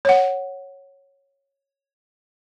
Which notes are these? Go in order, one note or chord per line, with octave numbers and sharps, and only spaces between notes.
C#5 F#5